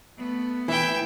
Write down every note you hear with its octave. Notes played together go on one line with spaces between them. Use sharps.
A3 B3
E3 E5 G5